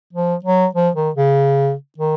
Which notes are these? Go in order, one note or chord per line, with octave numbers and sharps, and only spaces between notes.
F3
F#3
F3
D#3
C#3
D#3